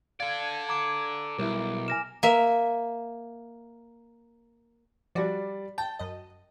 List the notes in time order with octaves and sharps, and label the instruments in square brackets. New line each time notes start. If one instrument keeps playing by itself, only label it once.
[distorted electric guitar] A4 D5 [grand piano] F5 [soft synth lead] G#6
[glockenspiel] A#5 D6 D7
[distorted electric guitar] B1 [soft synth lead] G3 [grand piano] E4 A#4
[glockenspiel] G#5 A#6 E7 [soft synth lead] F6
[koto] A#3 E5
[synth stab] F3 F#4 [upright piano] G3 D5
[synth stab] G5 [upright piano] A5
[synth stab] F#2 D#5